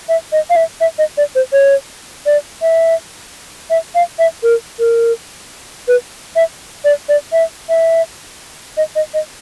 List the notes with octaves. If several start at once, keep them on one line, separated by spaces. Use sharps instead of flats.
E5
D#5
F5
E5
E5
D#5
D5
C5
C#5
D5
E5
E5
F5
E5
A#4
A#4
B4
E5
D5
D5
E5
E5
D#5
D#5
D#5